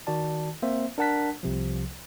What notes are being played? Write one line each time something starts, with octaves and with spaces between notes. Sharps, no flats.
D#3 F#4 D5 A5
A#3 C4 C5 E5
D4 A#4 F#5 A5 F#6 B6
C2 C3 F3